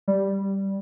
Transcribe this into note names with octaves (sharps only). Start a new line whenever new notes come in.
G3